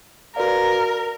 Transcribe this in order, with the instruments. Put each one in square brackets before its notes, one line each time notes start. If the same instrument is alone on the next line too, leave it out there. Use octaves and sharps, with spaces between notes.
[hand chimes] F#4 B4 D5 F5 [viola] A#4